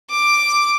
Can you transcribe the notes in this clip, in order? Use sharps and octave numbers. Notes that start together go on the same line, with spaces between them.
D6